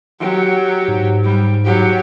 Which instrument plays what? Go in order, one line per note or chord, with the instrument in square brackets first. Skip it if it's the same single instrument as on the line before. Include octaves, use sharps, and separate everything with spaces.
[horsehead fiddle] F#3 G4
[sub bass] G#2
[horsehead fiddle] G3
F#3 G4